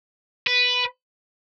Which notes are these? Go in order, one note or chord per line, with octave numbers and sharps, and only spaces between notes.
B4